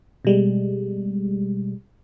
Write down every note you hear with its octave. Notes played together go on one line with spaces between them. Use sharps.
B2 G3 G#3